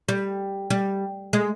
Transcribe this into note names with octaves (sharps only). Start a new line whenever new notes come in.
G3
G3
G#3